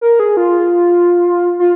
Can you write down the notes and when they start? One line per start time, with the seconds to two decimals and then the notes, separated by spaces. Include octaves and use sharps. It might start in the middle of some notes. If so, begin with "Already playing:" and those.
0.01 A#4
0.20 G#4
0.37 F4
1.60 F4